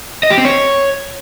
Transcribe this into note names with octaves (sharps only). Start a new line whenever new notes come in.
D#5
G4
C4
C#5